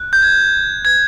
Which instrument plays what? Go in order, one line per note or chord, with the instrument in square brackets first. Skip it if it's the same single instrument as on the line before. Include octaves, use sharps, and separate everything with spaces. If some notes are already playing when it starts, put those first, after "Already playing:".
Already playing: [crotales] F#6
G6
G#6
G#6